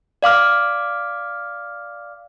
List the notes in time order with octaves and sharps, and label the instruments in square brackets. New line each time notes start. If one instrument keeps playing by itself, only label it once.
[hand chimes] D5 F5 D6 F6